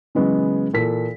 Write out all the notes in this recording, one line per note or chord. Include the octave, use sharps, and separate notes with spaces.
C#3 E3 F#3 G#3 B3 C#4
A#2 E3 A4 B6